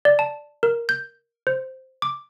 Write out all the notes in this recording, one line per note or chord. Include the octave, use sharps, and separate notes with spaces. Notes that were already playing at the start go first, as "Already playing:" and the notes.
D5
A5
A#4
G6
C5
D6